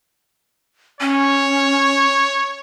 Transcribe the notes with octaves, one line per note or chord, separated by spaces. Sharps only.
C#4 C#5